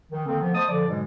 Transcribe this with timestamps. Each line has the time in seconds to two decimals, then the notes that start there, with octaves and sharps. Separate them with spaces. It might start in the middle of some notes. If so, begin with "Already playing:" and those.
0.11 D#3 E3
0.26 D3 D#3 A#3 C4
0.41 D3 F3 B3
0.55 A3 C5 D#5 A5 D#6
0.68 D3 F3 D5
0.87 G#2 B2 D3 E3 F#3 G#3